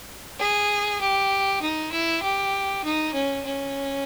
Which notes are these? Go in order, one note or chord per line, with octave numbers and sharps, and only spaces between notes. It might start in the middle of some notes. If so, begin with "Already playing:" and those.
G#4
G4
D#4
E4
G4
D#4
C#4
C#4